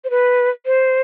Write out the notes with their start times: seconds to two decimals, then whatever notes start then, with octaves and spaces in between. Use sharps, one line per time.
0.04 C5
0.10 B4
0.66 C5